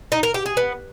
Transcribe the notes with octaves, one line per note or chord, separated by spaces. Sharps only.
D#4
A#4
G4
G#4
B3